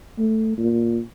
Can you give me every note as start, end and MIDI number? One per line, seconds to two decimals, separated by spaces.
0.18 0.53 57
0.58 1.00 46